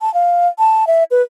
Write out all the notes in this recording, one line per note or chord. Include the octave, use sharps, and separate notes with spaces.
A5
F5
A5
E5
B4